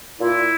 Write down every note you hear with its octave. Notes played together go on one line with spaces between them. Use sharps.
A#2 E4